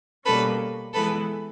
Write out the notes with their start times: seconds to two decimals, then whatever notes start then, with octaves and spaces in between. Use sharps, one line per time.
0.25 B2 G3 A#3 C#4 A4 B4
0.93 E3 G#3 B3 E4 A4 B4